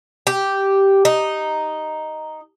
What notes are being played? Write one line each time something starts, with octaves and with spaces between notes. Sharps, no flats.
G4
D#4